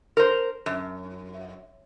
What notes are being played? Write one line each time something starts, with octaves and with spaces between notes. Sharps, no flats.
A#4 C5
F#2